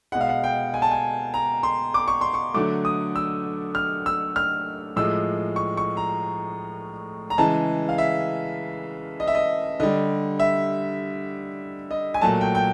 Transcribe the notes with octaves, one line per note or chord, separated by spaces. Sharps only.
B2 G#3 F#5
F5
F#5
G5
G#5
A5
G#5
A#5
C6
D6
C#6
C6
C#6
D3 F#3 A3 D6
D#6
E6
F6
E6
F6
A2 F3 G#3 E6
C#6
C#6
A#5
A#5
C#3 E3 G#3 A5
F5
E5
D#5
E5
D#5
D3 G3 D#5
E5
D#5
G#5
A#2 F#3 A3 A5
G5
G5